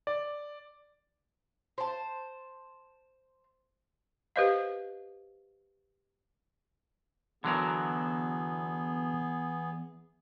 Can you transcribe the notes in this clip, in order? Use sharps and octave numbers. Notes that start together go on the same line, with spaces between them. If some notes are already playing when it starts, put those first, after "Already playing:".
D5
C5 A5
G4 B4 C5 D#5 F5
E2 D3 F#3 B3 E4 G#4 A#4